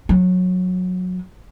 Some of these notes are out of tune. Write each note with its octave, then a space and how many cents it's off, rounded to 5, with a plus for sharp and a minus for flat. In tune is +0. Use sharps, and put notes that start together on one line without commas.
F#3 -20